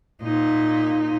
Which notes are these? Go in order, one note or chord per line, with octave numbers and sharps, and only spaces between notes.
A#2 D#4